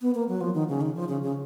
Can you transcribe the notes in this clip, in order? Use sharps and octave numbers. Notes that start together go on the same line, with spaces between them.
B3
A#3
F#3
F3
D#3
C#3
D#3
F3
C#3
C#3